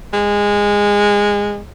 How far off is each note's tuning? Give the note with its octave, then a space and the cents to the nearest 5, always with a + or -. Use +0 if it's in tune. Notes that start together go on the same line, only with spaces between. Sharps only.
G#3 -20